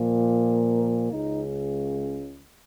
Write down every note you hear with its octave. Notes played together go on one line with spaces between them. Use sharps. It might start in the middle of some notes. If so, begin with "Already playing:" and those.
Already playing: A#2 F3 A#3
A#4
C#2 C#3 G#3 D#4